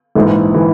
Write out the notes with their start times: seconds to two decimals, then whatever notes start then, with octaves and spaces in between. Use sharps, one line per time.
0.15 A#1 G#2 E3
0.54 E3